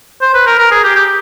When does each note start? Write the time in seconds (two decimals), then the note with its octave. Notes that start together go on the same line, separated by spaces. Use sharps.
0.22 C5
0.34 B4
0.47 A#4
0.59 A#4
0.71 G#4
0.84 G4
0.96 G4